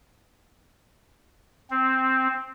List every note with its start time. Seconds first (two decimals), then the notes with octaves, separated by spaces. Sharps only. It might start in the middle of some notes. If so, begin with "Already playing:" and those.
1.70 C4